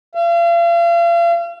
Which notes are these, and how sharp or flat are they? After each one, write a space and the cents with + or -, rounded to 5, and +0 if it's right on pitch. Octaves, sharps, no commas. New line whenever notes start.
F5 -40